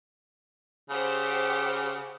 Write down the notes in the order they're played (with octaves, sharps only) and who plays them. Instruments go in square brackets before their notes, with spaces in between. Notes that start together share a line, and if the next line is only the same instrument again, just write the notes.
[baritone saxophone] C#3 [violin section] G4 C5 F#5